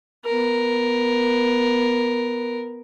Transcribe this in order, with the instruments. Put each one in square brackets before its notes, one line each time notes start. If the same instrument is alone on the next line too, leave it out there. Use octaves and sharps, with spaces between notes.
[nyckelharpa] B3 A#4